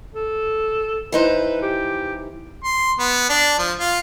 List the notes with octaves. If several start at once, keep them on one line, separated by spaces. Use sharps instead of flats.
A4
E3 D#4 B4 C5
G4
C6
B3
D4
F3
F4